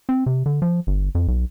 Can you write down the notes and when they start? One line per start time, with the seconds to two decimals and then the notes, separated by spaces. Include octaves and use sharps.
0.09 C4
0.26 C3
0.46 D3
0.62 F3
0.87 G1
1.15 F2
1.28 B1